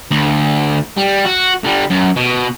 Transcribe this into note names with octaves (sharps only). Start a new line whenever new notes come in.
D2
G3
F#4
D3 G3
F#2
B2